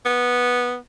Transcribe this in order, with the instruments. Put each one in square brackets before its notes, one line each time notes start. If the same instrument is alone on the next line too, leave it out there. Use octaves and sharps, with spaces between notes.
[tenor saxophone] B3